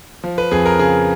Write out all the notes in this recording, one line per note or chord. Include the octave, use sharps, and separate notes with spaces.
F3
B4
F2 G#4
A#4
C#3 G#4